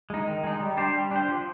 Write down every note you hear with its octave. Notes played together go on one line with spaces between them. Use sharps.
G#3 D#4
D#3
G#3 D#4
G3
D4 G4 C5
G3
D4 G4 C5
F3